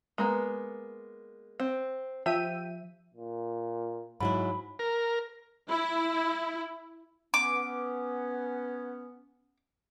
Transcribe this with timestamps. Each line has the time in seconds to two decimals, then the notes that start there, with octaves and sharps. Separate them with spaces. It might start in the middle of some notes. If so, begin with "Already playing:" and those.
0.18 G#3 A#3 B3
1.60 C4
2.26 F3 G4 E5 D#7
3.14 A#2
4.20 G#2 F#3 E4 B5
4.79 A#4
5.70 E4
7.34 B3 C#4 D6